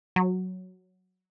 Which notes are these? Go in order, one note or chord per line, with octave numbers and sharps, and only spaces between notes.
F#3